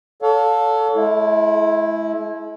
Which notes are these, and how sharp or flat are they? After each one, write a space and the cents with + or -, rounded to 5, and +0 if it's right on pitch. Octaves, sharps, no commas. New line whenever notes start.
A4 +0 C#5 +35 F5 +30
G#3 +45 E4 +0